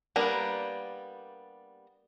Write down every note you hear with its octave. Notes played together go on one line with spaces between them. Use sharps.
G3 A#3 B3 D4 A#4